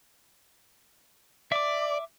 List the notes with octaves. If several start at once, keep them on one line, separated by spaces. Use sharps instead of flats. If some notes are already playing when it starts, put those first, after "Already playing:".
D5 E5 D6